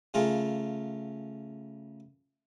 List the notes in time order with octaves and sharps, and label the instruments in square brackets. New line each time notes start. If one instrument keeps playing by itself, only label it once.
[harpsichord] C#3 A3 F4 G#4 A#4